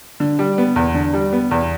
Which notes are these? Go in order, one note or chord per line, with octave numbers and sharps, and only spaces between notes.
D3
G3
B3
E2
D3
G3
B3
E2